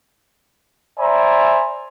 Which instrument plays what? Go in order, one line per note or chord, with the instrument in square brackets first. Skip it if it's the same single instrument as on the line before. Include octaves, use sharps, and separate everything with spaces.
[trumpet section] C5 D5 E5 G#5 A#5 B5